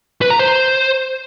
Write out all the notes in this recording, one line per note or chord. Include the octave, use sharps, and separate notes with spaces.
B4
A#5
C5